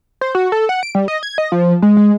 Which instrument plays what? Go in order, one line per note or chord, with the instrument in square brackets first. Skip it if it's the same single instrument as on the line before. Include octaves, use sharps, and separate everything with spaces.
[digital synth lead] C5
F#4
A4
F#5
D7
G3
D#5
G#6
D#5
F3
G#3
G#3